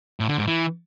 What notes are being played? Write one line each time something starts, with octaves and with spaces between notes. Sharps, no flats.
A2
D3
G#2
E3